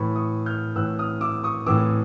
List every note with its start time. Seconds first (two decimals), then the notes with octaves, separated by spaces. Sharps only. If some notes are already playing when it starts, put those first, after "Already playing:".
Already playing: A2 E3 B5 C#6
0.15 C#6 D#6
0.46 F6 G6
0.76 A2 E3 E6 F#6
0.99 D#6 F6
1.21 D6 E6
1.44 C#6 D#6
1.66 A2 E3 D6 E6